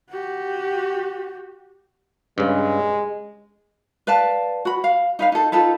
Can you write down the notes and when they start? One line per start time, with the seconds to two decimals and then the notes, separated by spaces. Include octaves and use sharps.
0.10 F#4 G4
2.38 G2 C#3 G#3
4.07 B4 D5 F5 A5
4.65 F#4 B5
4.84 F5
5.19 D#4 B4 F5
5.32 D#4 A4
5.52 D#4 F4 A4 B4